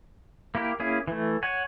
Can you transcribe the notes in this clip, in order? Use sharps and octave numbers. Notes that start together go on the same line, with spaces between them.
A#3 E4 G4 A#4
A#3 C#4 E4 G#4
E3 A3
C#5 F#5 G#5